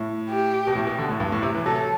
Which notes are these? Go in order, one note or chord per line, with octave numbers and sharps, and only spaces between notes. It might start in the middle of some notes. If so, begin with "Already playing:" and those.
Already playing: A2
G4
B2
A2
B2
D3
A2
G2
A2
C3
E3
F#3 A4